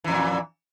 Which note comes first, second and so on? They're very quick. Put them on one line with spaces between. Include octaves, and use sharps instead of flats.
E3 F2 A#2